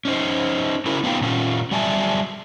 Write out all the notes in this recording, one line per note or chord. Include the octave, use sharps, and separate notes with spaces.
C#4 D#4 C5
C#4 E4 F#4 A#4
B3 D#4 F4 B4 F5 G5
A#2 C#4 F4
F#3 G3 D5 E5 G#5 A5